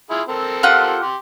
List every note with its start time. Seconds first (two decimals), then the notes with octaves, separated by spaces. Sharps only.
0.10 E4 F4 G#4
0.28 C4 A4 A#4
0.63 F4 G4 F#5
1.02 G4 C6